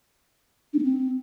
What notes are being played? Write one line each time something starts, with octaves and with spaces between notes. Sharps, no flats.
D4
A#3
C4